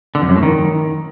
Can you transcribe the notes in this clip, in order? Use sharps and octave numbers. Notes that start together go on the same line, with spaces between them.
D3
F2
F#2
A2
D#3